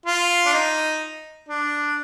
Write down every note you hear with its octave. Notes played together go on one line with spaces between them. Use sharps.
F4
D4
D#4
D4